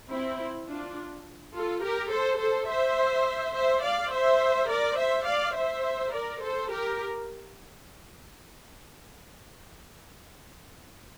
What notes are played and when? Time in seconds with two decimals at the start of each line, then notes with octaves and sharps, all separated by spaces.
0.11 C4 E4
0.68 D4 F4
1.54 F4 A4
1.83 G4 A#4
2.12 A4 C5
2.40 A4 C5
2.69 C5 E5
3.55 C5 E5
3.84 D5 F5
4.13 C5 E5
4.70 A#4 D5
4.98 C5 E5
5.27 D5 F5
5.56 C5 E5
6.13 A#4 D5
6.42 A4 C5
6.71 G4 A#4